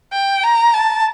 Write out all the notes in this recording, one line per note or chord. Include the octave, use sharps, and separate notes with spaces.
G5
A#5
A5